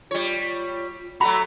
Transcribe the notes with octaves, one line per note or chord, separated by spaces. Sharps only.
G3 F4 C#5
F#3 A3 F#4 A#5 B5